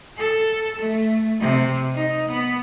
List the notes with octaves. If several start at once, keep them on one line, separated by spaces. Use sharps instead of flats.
A4
A3
C3
D#4
B3